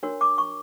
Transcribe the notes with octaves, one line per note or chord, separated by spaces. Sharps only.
D4 F#4 A#4 C#5
D6
C#6